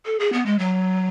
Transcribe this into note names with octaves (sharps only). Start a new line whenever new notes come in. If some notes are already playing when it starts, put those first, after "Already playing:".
A4
G#4
B3
G#3
F#3